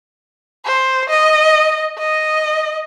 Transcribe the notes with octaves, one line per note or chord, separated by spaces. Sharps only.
C5
D#5
D#5